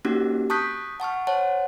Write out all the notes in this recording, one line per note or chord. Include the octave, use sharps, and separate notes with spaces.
A#3 C4 C#4 D#4 F#4 G4
A5 C#6 D#6 F#6 G6 B6
F#5 A5 C#6 F6
C5 C#5 F#5 A5